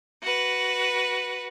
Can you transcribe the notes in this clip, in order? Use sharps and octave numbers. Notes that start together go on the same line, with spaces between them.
F#4 B4